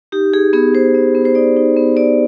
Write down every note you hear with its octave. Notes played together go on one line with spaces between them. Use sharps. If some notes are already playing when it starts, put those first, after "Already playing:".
D#4 G4
D#4 G#4
B3 G#4
B3 C5
B3
B3
C5
D#4 D5
D#4
B3
B3 D5